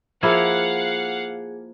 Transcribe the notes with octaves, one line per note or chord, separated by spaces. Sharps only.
F3 A#3 E4 G#4 F5 F#5 G#6